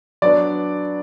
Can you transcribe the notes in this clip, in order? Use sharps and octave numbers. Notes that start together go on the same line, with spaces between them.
F#3 B3 D4 D5